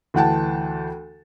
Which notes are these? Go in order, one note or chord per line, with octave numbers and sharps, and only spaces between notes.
D2 E3 F#5 G5 A5